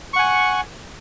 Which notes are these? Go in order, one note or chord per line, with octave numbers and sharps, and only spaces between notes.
F#5 G#5 C#6